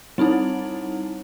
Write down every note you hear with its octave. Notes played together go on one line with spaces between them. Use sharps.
G3 C4 D#4 E4